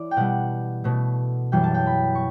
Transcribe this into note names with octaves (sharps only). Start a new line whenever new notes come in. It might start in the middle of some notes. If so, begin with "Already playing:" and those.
Already playing: E3 D5
G5
B2 G3 F#5
B2 A3
F#2 E3 G3 G5
A5
G5
B5
C#6